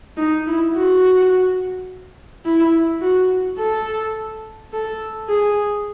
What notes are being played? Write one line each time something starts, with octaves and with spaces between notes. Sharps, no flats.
D#4
E4
F#4
E4
F#4
A4
A4
G#4